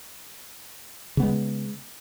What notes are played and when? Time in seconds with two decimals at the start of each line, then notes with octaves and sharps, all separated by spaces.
1.17 C#3
1.20 B3
1.22 G#3